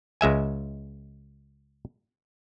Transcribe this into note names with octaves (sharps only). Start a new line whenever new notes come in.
C#2 G#3 E5 G#5